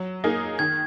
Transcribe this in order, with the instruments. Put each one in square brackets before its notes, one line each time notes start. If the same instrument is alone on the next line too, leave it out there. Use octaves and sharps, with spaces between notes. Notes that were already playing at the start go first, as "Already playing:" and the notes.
Already playing: [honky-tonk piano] F#3
A#3 D#4 G#4
[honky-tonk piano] D#3 [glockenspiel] G#6